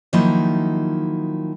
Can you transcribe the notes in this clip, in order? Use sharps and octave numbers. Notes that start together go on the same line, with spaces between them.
D#3 F3 F#3 A#3 D#4 E4